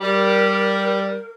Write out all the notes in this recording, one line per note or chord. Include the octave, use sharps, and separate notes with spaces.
G3 A#4